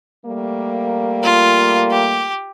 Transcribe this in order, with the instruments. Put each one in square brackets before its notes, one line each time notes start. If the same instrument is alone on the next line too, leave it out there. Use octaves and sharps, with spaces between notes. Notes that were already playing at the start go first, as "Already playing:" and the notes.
[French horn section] G3 A3 A#3
[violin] F4
G4